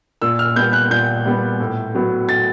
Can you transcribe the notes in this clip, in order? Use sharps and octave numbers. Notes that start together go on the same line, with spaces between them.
A#2 E6
F6
G3 B3 G6
F#6
A#2 G6
G3 B3
A2
F#3 B3
A2 A6